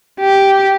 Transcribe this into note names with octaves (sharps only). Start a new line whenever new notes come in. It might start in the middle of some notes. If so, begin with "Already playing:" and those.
G4